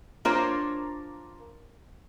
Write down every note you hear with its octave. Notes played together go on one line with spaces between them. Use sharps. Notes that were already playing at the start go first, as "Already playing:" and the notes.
A#3 D4 F4 A#4 C5 C#5